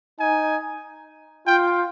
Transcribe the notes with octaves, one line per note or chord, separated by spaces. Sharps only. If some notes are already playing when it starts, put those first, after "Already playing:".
D#4 G#5
F4 G5